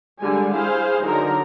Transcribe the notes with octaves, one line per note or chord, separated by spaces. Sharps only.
D3 G3 G#3 G#5
E4 G#4 C5 F5
D3 F#3 D#4 A#4 A#5